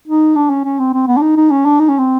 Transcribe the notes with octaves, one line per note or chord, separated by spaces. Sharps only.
D#4
D4
C#4
C#4
C4
C4
B3
D4
D#4
D#4
C#4
D4
D#4
C#4
C4